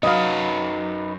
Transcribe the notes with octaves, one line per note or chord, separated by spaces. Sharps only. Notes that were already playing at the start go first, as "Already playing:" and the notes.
F#2 F#3 D#4 B4 D#5 F5 B5